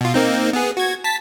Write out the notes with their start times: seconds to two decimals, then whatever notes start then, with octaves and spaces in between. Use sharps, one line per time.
0.01 B2 F4
0.14 A#3 C4 D#4
0.53 B3 G#4
0.77 F#4 G#6
1.04 A5 A6 B6